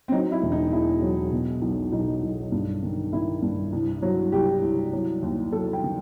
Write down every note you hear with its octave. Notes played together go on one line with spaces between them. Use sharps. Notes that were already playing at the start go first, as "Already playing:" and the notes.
C4
F#3 D#4
E4
E1
D#4
E2 E4
F#3
B2
B1
B1 D#4
B1
G2
D#3
D#3 E4
G2
C2
F#3
C2 G4
C2
F#3
D#2
F#3 A4
G5
D#3